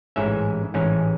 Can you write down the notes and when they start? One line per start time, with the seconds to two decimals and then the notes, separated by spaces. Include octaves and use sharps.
0.16 A1 G#2 E3 G#3 C#4 E5
0.74 A1 G#2 E3 G#3 C#4